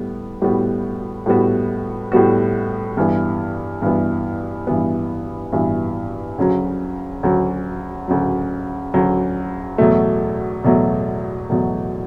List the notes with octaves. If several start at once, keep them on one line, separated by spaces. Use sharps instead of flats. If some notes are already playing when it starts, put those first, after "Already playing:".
Already playing: A2 G3 B3
A2 G3 B3 F#4
A2 G3 B3 F#4
A2 G3 B3 F#4
G2 E3 B3
G2 E3 B3
G2 E3 B3
G2 E3 B3
D2 C#3 F#3
D2 C#3 F#3
D2 C#3 F#3
D2 C#3 F#3
E2 B2 F#3 A3
E2 B2 F#3 A3
E2 B2 F#3 A3